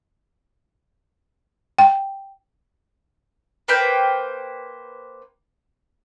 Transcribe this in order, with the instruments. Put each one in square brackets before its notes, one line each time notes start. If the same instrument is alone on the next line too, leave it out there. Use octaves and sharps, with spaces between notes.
[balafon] G5
[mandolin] A#3 B4 C5 G5